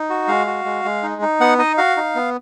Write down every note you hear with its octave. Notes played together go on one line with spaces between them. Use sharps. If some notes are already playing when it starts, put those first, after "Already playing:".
Already playing: D#4
F#4
G#3 F5
F#4
G#3
G#3
D#4
D#4
B3 F#5
D#4 D#5
F#4 F5
D#4
B3